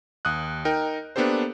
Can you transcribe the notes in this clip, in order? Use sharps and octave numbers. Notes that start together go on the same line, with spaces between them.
D#2 D#6 F#6
D#4 A#4 G5
A#3 B3 D4 G4 A4 C5